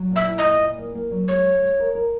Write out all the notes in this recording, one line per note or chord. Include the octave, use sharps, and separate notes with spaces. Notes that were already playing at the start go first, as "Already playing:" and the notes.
Already playing: F#3
A#2
E5
E4
D#5
A#2
A#2
A#3
A#3
F#3
G#3 C#5
G#3
G#3
A#4
A#4